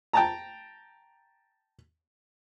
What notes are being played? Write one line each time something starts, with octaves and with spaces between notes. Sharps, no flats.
G5 A5 A#5